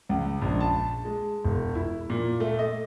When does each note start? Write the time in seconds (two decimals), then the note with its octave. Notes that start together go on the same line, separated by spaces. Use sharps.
0.09 C#2
0.42 A#1
0.60 A5
1.05 G#3
1.44 E1
1.75 E4
2.10 A#2
2.40 A3
2.59 D#5